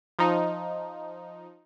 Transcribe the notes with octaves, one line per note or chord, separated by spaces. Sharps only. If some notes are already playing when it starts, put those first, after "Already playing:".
F3 D#4